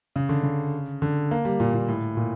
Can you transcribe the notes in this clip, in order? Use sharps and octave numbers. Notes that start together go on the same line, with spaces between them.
C#3
D3
C#3
D3
A#3
G3
A#2
A#2
A2
A#2